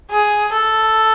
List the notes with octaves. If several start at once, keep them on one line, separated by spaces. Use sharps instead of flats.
G#4
A4